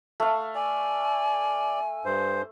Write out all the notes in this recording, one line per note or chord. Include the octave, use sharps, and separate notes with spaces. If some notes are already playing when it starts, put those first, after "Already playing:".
A3 F5
D5 G#5
G2 C5